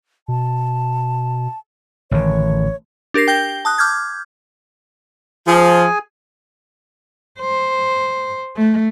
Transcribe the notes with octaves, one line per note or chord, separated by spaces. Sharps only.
B2 A5
A1 D3 D#3 C#5
D4 G4 A#4 A#6 C7
G5 G6 A#6 G7
A5 D#6 F#6
D6 F6 G6 G#6
F3 G#4 G#5
C5
A3